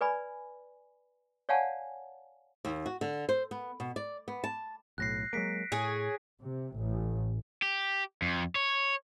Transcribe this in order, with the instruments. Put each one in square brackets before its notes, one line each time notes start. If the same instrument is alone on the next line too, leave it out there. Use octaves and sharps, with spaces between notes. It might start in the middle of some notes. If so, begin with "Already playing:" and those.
[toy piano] B4 D5 G#5 B5
C#5 D5 F5 F#5 G#5 A5
[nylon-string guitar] D#2
F#4
D3
C5
B3
B2
D5
B3
A5
[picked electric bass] B1 A2 [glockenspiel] F#6 A#6 C7
[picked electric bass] F#3 G#3 A#3 [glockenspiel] B6 D7
[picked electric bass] A2 [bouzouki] G#4 C#5
[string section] C3
A1
[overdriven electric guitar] G4
F2
C#5